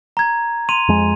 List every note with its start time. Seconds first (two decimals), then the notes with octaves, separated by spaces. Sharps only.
0.17 A#5 G#6
0.69 C6 D#7 F7
0.88 F2 G#3